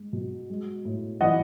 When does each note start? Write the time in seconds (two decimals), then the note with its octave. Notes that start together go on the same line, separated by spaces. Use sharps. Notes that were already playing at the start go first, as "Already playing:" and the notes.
Already playing: G#3
0.13 B2
0.50 G#3
0.85 A2
1.21 E3 D#5 F#5